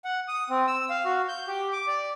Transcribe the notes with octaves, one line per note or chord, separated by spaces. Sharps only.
F#5
D#6
C4
E6
F5
F#4
G6
G4
D6
D5